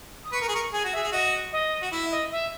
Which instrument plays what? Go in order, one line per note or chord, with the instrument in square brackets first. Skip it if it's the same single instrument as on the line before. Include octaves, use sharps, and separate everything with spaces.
[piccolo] D#6
[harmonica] B4 [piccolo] C#6
[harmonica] A#4
G#4
[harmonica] A#4 [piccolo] C#6
[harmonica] G#4 [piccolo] G#5
[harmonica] F#4
[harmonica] G#4 [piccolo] E5
[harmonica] G#4
[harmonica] F#4 [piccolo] D#5
[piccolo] D#5
[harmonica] F#4
[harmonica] E4 [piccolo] E5
[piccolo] D#5
E5